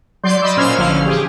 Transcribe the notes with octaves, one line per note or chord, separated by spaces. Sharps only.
F#3 D5 C6 G6
D5 D#5 B5 C6 D6 E6
A#2 C#4 C5 E6 F6 G#6
A1 D3 F3 C#4 F5 F6
G4 G#4